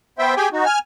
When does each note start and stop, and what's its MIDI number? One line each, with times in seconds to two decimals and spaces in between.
0.19 0.35 59
0.19 0.35 72
0.19 0.35 76
0.19 0.35 79
0.37 0.49 67
0.37 0.49 68
0.37 0.49 79
0.37 0.49 80
0.53 0.65 63
0.53 0.65 66
0.66 0.79 80
0.66 0.79 89